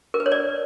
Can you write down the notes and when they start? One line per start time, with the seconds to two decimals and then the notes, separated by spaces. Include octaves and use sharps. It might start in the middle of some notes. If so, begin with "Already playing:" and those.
0.14 A#4
0.20 B4
0.26 C#5
0.32 D5